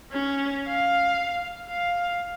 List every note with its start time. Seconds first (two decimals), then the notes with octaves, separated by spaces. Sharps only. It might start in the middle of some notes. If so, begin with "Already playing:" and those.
0.12 C#4
0.68 F5
1.70 F5